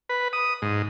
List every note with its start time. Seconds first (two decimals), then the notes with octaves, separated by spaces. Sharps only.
0.09 B4
0.33 D#6
0.62 G#2